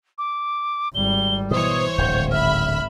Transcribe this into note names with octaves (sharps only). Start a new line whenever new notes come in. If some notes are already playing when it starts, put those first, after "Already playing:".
D6
G#1 G3 G7
B2 E3 C5 C#5 D#6
D1 G#1 D3 G6
E5 B5 F6